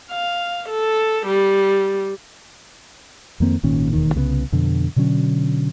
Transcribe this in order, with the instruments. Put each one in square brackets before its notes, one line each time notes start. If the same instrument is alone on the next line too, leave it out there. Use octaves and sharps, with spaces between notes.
[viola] F5
A4
G3
[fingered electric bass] F2 D#3 A#3 C4
G#1 A#2 D#3 C#4
E1 D#2 D#3
C2 C#3 G#3 B3
F2 B2 D3
B2 D3 F#3 C#4